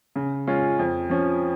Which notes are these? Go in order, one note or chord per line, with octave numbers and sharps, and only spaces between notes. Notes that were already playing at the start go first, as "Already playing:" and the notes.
C#3
G#3 C#4 F4
F2
F3 C#4